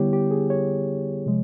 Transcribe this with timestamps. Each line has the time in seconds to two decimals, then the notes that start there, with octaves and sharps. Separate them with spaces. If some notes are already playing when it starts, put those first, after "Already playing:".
Already playing: D3 G3 B3 E4 G4 C#5
0.13 G4
0.31 G#4
0.50 C#5
1.26 C3 F3 G#3